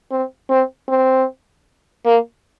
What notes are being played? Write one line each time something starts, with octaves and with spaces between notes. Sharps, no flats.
C4
C4
C4
A#3